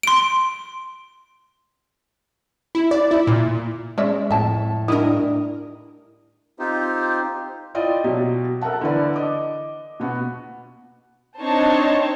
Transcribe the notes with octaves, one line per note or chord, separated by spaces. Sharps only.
C6 D7
E4
D5
E4
A#2
G#3 C#4 D5 E5
F2 A2 E5 A5
D#3 G3 D4 E4 A#4 D#6
C4 D#4 F4 G4 C5
E4 F4 D5 D#5 G5
B2 F#3 G4
A4 A#4 E5 F#5 A5
D3 E3 B4 D5
D#5 D6
B2 B3 F#4
C4 D4 D#4 C5 C#5 A5